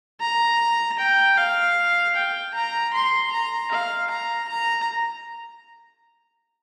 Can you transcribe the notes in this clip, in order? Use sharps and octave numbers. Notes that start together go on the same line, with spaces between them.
A#5
G5
F5
G5
A#5
C6
A#5
F5
A#5
A#5